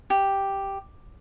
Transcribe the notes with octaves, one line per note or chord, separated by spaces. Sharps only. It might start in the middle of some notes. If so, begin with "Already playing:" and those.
G4